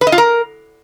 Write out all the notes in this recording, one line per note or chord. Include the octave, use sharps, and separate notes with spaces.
B4
D#5
F4
A#4